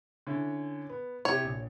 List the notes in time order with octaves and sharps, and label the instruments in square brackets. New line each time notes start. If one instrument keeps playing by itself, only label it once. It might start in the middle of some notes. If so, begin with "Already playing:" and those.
[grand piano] D3 C#4 E4
B3
[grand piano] C3 E4 G4 [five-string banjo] C#5
[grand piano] A#1